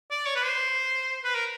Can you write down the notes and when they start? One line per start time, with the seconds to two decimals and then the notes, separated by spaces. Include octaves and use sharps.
0.11 D5
0.26 C#5
0.35 B4
0.43 C5
1.24 B4
1.35 A#4